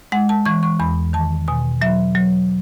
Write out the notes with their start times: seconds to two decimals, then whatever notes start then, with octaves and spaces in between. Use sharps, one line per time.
0.12 G#3 F#5
0.29 A5
0.45 E3 C#6
0.63 C#6
0.80 E2 B5
1.13 D#3 A5
1.48 B2 G#5
1.81 F#3 E5
2.15 F#3